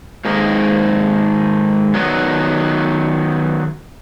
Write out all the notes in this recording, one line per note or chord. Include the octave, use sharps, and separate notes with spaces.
G#2 D#3 A#3
D#3 F#3 B3